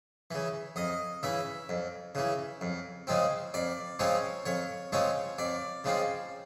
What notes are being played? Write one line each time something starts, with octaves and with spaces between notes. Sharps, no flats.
C#3 E3
F2 D#5
C#3 E3 E5
F2
C#3 E3
F2
C#3 F3 G#3 C4
F2 D5
C#3 F3 G#3 C4 C#5
F2 C#5
C#3 F3 G#3 C4 C#5
F2 D5
C#3 F3 G#3 C4